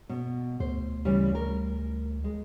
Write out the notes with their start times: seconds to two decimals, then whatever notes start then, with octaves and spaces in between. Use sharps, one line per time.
0.09 B2
0.60 D2 C5
1.05 C#3 E3 G3
1.35 A#4
2.24 G#3